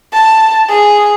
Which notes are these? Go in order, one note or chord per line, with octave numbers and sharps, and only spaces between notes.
A5
G#4